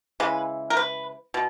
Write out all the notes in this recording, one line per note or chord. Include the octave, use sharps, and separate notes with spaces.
C#3 E3 G#3 B4
A#4
B4
B2